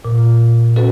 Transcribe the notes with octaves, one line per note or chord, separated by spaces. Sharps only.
A#2
C#4 F#4 A4 B4